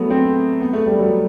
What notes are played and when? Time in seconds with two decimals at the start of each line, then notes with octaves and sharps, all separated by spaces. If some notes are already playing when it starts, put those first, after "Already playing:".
Already playing: F#3 A3 B3
0.10 C4
0.61 B3
0.73 A3
0.86 G3
0.99 F#3